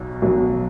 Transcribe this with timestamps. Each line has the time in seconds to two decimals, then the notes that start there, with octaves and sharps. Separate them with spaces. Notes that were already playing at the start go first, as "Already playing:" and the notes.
Already playing: B1 B2 F#3
0.22 B1 B2 F#3